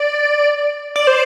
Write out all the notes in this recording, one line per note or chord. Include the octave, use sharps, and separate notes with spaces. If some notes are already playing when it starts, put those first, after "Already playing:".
Already playing: D5
D5
C5